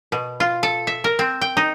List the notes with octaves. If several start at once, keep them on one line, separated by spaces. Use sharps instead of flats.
B2
F4
A4
E5
A#4
C4
G5
D#4